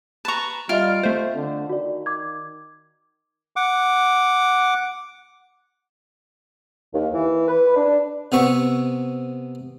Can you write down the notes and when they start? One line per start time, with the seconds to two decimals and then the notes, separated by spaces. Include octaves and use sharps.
0.25 B4 A5 A#5 C#6
0.69 G3 F4 D#5 E5 F6 D7
1.03 A3 C4 C5
1.35 D3
1.69 D#3 F#4 D5
2.06 D6 G#6
3.56 F#5 D6
6.94 D#2
7.14 E3
7.48 B4
7.76 D4
8.32 C3 B3 E5 C#6